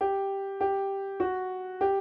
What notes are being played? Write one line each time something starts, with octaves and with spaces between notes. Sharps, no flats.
G4
G4
F#4
G4